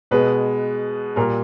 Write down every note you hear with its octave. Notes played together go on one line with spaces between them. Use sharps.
B2 G#3 B4
A#2 G3 A#4